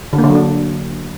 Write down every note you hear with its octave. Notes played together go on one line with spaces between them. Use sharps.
D3
A#3
D3
F#3
D4